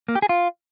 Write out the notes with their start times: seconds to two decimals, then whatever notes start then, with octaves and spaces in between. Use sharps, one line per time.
0.08 A#3
0.15 G4
0.22 G#4
0.29 F4